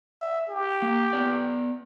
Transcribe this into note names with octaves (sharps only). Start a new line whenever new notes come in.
E5
G4
A#3
B3 D5